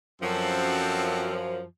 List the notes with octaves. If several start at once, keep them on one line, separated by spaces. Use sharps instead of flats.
F#2 F3 C4 F#4 A4